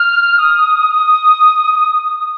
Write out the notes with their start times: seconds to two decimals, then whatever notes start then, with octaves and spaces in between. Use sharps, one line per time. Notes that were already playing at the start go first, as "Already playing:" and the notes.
Already playing: F6
0.38 D#6